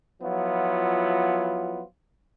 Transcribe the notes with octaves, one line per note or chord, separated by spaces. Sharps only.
F3 F#3 B3 E4 F4